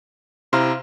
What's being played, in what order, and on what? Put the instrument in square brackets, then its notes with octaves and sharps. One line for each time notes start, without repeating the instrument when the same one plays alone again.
[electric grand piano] C3 E4 A#5 [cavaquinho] C5 F5 C6